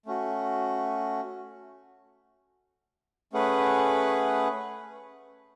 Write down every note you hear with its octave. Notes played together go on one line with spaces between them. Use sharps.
A3 C#4 F#4
A3 C#4 G#4 B4 F#5